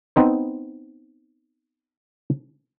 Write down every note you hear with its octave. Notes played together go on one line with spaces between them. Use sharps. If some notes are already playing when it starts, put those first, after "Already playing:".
B3 C4 D#4 C5